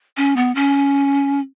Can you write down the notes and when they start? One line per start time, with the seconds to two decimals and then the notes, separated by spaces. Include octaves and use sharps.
0.17 C#4
0.36 B3
0.55 C#4